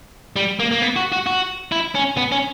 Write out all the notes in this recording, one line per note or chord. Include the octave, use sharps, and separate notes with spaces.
G3
A#3
A#3
B3
F#4
F#4
F#4
E4
C#4
B3
C#4